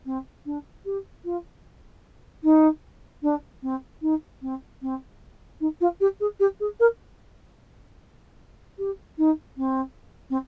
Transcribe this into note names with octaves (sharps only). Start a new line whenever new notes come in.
C4
D4
G4
F4
D#4
D4
C4
D#4
C4
C4
D#4
F4
G4
G#4
G4
G#4
A#4
G4
D#4
C4
C4